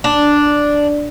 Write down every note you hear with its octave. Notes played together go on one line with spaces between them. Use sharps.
D4